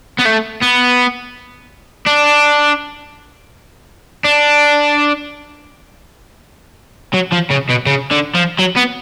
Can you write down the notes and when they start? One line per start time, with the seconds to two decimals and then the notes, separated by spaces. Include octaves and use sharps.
0.19 B3
0.25 A3
0.62 B3
2.07 D4
4.24 D4
7.14 F#3
7.32 F3
7.50 C#3
7.69 B2
7.86 C#3
8.11 D3
8.35 F3
8.59 F#3
8.77 B3